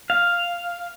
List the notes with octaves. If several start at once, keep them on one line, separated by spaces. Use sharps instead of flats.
F5